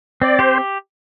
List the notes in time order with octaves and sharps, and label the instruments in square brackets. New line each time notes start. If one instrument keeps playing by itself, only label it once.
[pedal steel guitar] C4 [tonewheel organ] D5
[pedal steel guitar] G4 [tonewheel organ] C5